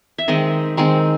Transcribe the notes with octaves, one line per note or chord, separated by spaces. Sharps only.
E5
D#3 G#3 C4 D#5
D#3 G#3 C4